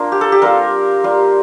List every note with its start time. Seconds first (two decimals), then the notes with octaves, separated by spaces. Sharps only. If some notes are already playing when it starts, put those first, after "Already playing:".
Already playing: A#3 D4 F4
0.12 G4
0.21 A4
0.32 G4
0.42 G3 C4 F4 A#4
1.04 G3 A#3 F4